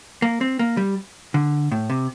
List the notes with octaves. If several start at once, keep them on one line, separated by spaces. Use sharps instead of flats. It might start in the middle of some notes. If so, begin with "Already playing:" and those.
A#3
C4
A#3
G3
D3
A2
C3